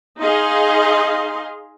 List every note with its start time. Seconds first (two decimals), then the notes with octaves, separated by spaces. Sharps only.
0.19 D#4 G#4 D#5 F5 C6